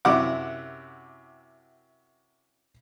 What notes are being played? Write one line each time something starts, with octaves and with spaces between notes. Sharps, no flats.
F#2 C3 E4 G4 F#5 D6